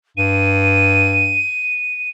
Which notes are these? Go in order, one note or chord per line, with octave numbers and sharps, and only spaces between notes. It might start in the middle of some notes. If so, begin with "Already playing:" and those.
G2 D#7